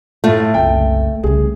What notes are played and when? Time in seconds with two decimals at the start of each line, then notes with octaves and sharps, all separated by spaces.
0.24 A2 A3 F4
0.54 F#1 C2 G5
1.23 C2 C#3 G#4